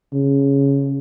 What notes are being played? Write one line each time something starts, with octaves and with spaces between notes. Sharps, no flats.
C#3